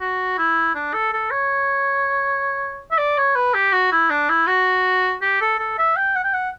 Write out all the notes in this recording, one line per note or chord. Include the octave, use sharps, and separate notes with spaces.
F#4
E4
D4
A4
A4
C#5
E5
D5
C#5
B4
G4
F#4
E4
D4
E4
F#4
G4
A4
A4
E5
G5
F#5
G5
F#5